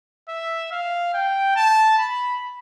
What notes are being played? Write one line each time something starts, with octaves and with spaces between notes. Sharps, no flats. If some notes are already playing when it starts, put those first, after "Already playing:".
E5
F5
G5
A5
B5